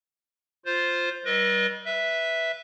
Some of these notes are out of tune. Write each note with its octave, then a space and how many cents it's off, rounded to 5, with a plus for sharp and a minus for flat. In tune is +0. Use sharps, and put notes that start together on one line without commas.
F4 +0 C5 +0
G3 -30 B4 -40 D#5 +0
B4 -5 E5 -5